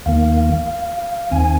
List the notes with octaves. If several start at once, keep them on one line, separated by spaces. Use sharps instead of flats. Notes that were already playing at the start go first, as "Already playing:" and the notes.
D#2 D#3 A#3 F5
D#2 D#3 C4 G#5